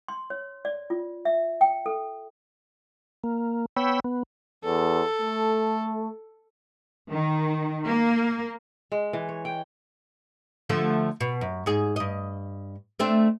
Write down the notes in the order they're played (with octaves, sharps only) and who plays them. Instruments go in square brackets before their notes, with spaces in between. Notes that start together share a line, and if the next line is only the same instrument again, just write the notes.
[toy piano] C6
C#5
D5
F4
E5
G5
A4
[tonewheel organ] A#3
B3 C#5 G5 B5 E6
B3
[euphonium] E2 [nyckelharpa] A4
[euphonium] A3
[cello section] D#3
A#3
[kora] G#3
E3
C#5
G5
[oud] D3 F3 A3
B2
F#2
G#2 G#4
G2 D#5
A3 C4 D4